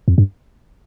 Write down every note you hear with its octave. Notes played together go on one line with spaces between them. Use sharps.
F2
G2